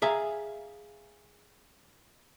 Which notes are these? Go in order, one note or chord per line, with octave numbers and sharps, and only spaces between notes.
G#4 E5 F5 A#5